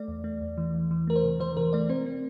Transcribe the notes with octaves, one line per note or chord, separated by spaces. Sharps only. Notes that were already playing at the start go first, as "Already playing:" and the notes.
Already playing: A3 D5
E2
A3
E2
E3
E2
E3
A3 A#4
C5
C3
E3 C5
C3 A#4
A3 D5
C4 C5
C4